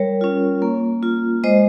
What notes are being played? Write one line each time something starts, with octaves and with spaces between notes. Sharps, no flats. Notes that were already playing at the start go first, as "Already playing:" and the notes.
Already playing: G3 A#4 C#5
C#4 F4
A#3
F4
G#3 C5 D#5